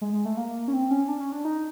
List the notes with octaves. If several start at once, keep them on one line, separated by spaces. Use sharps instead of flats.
G#3
G#3
A3
A#3
C#4
C4
C#4
D4
C#4
D4
D#4